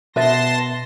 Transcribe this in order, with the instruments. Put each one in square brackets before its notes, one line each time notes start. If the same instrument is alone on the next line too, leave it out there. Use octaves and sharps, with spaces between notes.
[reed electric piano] B2 A6 [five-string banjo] B3 E5 [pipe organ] A5 C6 A#6